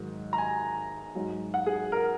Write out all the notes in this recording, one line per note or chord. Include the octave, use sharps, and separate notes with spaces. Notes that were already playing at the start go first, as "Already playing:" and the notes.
Already playing: G#2 D#3 F#3
A#5
G#5
G#2 F#3
F#5
G#4
A#4